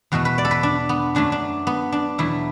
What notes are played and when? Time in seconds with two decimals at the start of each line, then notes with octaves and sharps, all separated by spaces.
0.12 E2 B2 A3 F#4
0.25 B4
0.38 D5
0.45 A4
0.51 B4
0.63 D4
0.89 B3
1.15 F#2 F#3 A3 D4
1.32 D4
1.67 B3
1.92 D4
2.18 E2 B2 F#3 A3 E4